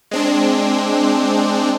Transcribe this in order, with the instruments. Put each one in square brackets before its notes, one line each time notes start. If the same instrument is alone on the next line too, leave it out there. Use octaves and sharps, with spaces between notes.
[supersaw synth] G#3 C4 D4